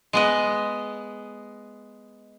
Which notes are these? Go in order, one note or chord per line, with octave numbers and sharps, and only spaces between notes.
G#3 B3 D#5